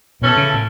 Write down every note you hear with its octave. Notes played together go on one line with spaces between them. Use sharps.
B2 E3 C#4 A4
C#3
A2